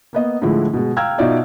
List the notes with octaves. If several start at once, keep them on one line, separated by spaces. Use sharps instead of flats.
A#3 B3 D#5
A2 D3 F3 G#3 E4
B2 G#3
F5 G5 A#5 E6 F6 G#6
B2 D#4 F4 D5 E5